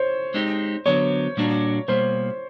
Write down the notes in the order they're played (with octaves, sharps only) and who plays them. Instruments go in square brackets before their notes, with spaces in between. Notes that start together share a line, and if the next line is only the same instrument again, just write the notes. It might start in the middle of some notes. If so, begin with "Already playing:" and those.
Already playing: [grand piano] C5 C#5
[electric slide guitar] G#3 C4 D#4 G4
[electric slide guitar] D3 F#3 B3 [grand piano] C#5
[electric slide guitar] A#2 G3 A#3 D4 F#4
[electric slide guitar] B2 G3 A#3 [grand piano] C5